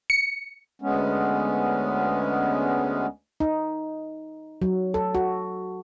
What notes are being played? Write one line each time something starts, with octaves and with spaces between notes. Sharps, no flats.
C#7
D2 G#3 B3 C#4
D#4
F#3
A4
F#4